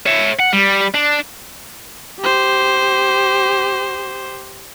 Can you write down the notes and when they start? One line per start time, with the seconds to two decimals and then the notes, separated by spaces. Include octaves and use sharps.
0.06 C#5 E5
0.40 F#5
0.53 G3
0.95 D4
2.20 G4 C5